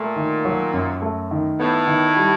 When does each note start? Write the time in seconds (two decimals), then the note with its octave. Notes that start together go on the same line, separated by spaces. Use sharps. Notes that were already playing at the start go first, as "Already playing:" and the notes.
Already playing: A#2 A3
0.16 D#3
0.45 F#3
0.73 F#2
1.02 A3
1.31 D#3
1.59 A2 B3
1.87 D#3
2.16 G3